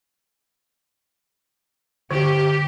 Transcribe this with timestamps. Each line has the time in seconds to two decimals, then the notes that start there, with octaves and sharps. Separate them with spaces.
2.11 D3 G4